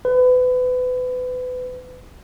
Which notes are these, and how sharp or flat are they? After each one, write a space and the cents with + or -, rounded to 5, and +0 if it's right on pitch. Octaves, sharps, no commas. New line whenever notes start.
B4 +30